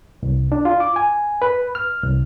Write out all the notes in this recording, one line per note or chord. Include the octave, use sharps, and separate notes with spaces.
C2
D4
F4
D6
G#5
B4
F6
C2